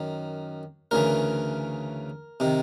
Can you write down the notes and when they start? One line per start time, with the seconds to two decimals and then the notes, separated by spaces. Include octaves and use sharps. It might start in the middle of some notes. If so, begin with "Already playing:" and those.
Already playing: F#2 D#3
0.91 D2 C#3 E3 A#4
2.40 C3 D#3